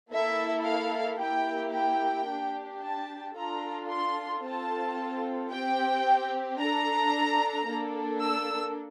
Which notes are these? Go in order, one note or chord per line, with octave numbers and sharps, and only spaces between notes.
A#3 E4 A4 E5
F5
A#3 E4 G4 G5
G5
D4 G4
A5
D4 F4 A4 A#5
C6
C4 F4 A4 A5
C4 G4 G5
D4 A4 A#5
A#3 D4 A4
E6